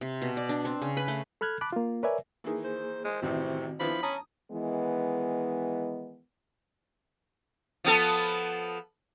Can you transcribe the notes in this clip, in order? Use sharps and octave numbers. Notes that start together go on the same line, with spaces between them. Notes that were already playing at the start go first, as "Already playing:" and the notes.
C3
B2
D5
D4
C4
C#3
B4
A3
A4 B5 F6 F#6 G#6
A5 B5 D6 F#6
A#3 F4
A#4 B4 C#5 D5 E5 G#5
D#3 E3 A#3 G#4
C5
G#3 C5
A1 A2 C3 D#3 E3 C4 F#4
E3 F3 B3 D4 B5
C#4 A5 A#5 D#6
D#3 E3 G#3 B3
F3 B3 A4